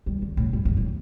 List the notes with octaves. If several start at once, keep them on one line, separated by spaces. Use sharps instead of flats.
G3
D3
A2
G2
G2
A2